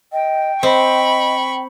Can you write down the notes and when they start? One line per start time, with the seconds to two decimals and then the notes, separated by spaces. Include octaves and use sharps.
0.12 D#5 G5
0.63 C4 D#5 B5 C#6